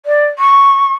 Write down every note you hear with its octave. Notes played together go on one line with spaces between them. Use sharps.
D5
C#6